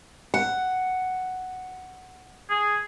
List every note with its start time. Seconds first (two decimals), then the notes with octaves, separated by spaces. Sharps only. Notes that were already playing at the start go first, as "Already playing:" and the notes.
0.34 F#5
2.50 G#4